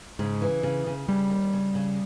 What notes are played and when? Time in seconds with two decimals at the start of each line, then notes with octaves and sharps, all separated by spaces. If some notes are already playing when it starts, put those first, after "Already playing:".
0.19 G#2 C#3
0.42 E3
0.63 C#3
0.86 C#3
1.08 C#3 G3
1.30 D#2
1.53 C#3
1.75 C#3